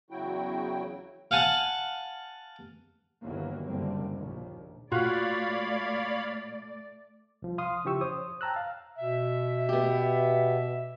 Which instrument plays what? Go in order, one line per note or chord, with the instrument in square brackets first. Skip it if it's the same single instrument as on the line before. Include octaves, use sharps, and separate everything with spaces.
[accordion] E2 C#3 F#3 E4 F#4 G5
[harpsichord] F5 F#5 G#5 A5
[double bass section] G1 D#2 D#3 E3 F#3 A#3
F#1 C2 D3 G3 A#3 C4
A#1 D#2
[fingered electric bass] A#2 [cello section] A3 D5 [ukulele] F4 F#4 [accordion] C#5 F5 B5
[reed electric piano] C2 F3
F5 C6 D#6
C#3 F3 E4 G4 C#6 E6
C5 C#5 D#6
G5 A5 A#5 E6 F#6
F5
[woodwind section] B2 E5
[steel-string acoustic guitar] B3 G4